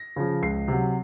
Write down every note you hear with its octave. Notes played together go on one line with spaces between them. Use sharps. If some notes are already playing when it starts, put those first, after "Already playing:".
Already playing: A#6
C#3 F3
C#2 C7
C3 F#3